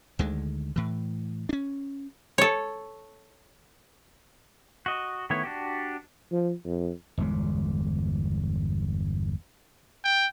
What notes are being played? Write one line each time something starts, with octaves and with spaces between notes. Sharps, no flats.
D2 D3 D#3 G#3
A2 E3
C#4 D4
A4 C#5
F#4 D#5
D#3 A3 B3 E4 C#5
D4 F#4 G4
F3
F2
G1 E2 A#2 G#3
G5